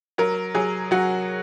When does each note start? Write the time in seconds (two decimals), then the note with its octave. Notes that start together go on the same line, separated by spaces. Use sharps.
0.18 F#3 A#4
0.55 F#3 G#4
0.91 F#3 F#4